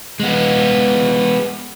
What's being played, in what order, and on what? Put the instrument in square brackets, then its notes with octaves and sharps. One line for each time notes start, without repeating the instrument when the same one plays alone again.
[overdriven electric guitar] G#3 B3